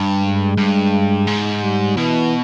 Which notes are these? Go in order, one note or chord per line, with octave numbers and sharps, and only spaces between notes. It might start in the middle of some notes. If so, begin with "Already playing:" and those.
Already playing: G2
G#3
G2
G#2
G3
B2 E3